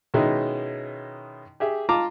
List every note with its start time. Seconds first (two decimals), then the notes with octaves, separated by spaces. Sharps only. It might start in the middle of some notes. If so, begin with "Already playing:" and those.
0.14 B2 D#3 G#3 C#4 D#4 E4
1.60 G4 G#4 E5
1.89 F4 A5 A#5 D6